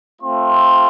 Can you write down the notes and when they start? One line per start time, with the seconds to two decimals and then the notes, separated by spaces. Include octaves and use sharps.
0.21 A3 C4 F4 C6